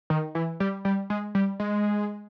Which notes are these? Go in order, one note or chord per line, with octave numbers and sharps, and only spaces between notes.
D#3
E3
G3
G3
G#3
G3
G#3